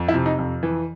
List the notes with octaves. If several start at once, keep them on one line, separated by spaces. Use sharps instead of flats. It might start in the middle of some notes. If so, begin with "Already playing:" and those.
Already playing: F2
E4
C3
D#4
F2
E3